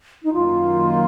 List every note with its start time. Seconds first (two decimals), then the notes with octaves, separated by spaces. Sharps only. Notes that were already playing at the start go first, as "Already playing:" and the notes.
0.23 D#4
0.33 F#2 D#3 A#3 F4